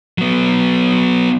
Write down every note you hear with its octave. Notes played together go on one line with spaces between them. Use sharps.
F#3 B3